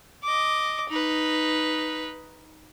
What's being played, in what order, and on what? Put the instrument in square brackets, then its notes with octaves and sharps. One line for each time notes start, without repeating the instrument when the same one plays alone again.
[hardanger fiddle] D#5 D6
D#4 B4